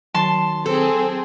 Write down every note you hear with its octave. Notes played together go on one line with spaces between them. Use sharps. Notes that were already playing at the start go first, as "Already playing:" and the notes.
D#3 F#3 A5 C6
C4 G#4 A4